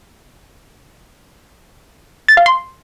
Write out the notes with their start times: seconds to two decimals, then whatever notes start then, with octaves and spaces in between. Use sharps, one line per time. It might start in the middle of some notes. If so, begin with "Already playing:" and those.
2.28 A6
2.37 F5
2.46 C6